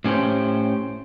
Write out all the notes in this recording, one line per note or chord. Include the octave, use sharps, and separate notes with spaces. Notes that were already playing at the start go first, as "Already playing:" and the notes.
A2 C#4 G4 C5